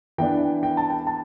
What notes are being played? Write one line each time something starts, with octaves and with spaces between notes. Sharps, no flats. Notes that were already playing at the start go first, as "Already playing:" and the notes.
E3 B3 D4 G5
G5
A5
G5
A5